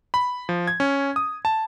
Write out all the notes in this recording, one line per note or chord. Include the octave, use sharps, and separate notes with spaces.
B5
F3
G#6
C#4
D#6
A5